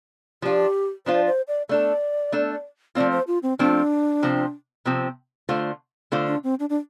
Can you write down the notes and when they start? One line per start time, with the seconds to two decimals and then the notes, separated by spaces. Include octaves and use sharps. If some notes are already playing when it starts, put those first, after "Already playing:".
0.42 F3 D4 F4 G4
1.06 F3 D4 F4 C5
1.27 C5
1.48 D5
1.69 A3 D4 A4 D5
2.32 A3 D4 A4
2.95 F3 A3 C4 F4 D5
3.12 C5
3.27 F4
3.43 C4
3.59 F3 A3 C4 D4 F4
4.23 C3 F3 C4
4.85 C3 F3 C4
5.49 D3 A3 F4 C5
6.12 D3 A3 F4 C5
6.27 D4
6.44 C4
6.60 D4
6.70 D4